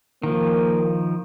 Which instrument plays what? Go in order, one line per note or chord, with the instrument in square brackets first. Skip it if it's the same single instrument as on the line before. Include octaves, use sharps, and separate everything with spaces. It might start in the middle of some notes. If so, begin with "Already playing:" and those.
[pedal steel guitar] D#3 F3 [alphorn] A#3